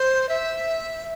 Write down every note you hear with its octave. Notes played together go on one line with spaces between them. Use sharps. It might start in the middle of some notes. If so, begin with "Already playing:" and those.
Already playing: C5
E5